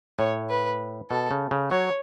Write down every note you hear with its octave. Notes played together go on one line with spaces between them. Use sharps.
A2 C#5
B4
B2 A4
C#3
C#3
F#3 C#5